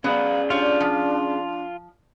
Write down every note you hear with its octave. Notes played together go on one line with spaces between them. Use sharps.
F#3 B3 C#4 G#4 D5 F5
G3 D4 F4 C#5 F5
F3